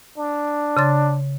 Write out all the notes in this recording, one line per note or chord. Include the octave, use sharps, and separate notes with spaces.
D4
C#3 C6 A6